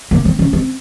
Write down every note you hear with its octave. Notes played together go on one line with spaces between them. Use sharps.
A#3
C4
C#4
C4